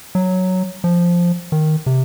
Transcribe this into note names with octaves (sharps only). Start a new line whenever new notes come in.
F#3
F3
D#3
C3